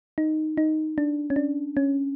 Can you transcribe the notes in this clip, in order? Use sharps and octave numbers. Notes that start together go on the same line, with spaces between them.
D#4
D#4
D4
C#4
D4
C#4